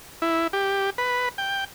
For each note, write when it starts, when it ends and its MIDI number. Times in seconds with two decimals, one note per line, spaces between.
0.22 0.47 64
0.53 0.90 67
0.98 1.29 71
1.38 1.64 79